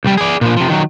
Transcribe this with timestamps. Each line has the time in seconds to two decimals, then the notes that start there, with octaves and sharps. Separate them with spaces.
0.04 C2 G3
0.18 G#4 D5
0.41 A#2 F3
0.57 C3 F3
0.70 D#3 F#3